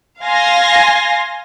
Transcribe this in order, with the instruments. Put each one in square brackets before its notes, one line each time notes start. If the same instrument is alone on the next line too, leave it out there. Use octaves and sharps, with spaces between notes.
[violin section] F5 G#5 C6 A#6